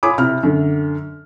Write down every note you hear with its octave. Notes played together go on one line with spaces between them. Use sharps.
F4 C#5 G#5 B5 D6 D#6
C3 E4 F6
F#2 D3